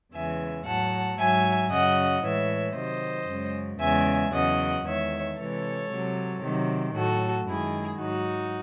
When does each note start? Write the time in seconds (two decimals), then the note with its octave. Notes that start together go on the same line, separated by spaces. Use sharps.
0.14 E2 C#3 E3 G#3 E5 G#5
0.66 A2 F#3 F#5 A5
1.18 G#2 F#3 E5 G#5
1.71 F#2 C#3 F#3 D#5 F#5
2.23 A2 E3 G#3 C#5 E5
2.75 C3 D#3 F#3 C5 D#5
3.28 F#2 C#3 G#3
3.80 E2 C#3 G#3 E5 G#5
4.33 E2 C#3 F#3 D#5 F#5
4.85 E2 D#3 G#3 C#5 E5
5.37 C3 E3 G#3 A4 C#5
5.91 C3 F#3
6.43 C3 D#3 F#3
6.95 A2 F#3 F#4 A4
7.47 F#2 D#3 G#3 E4 G#4
8.00 G#2 F#3 D#4 F#4